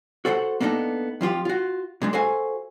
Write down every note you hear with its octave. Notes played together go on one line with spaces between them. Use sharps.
F#4 A4 C5 F5 F#5
A#3 B3 D4 D#4 A4
F2 F3 F4 G4
F4 F#4
A#2 G#3 D4
F#4 A4 C5 F5 G#5